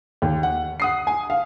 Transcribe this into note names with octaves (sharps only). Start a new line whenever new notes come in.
D#2
F#5
F#5 D#6 C7
G#5
F5